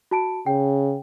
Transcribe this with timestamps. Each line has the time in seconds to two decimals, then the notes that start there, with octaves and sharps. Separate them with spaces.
0.11 F#4 A5 D7
0.46 C#3 G5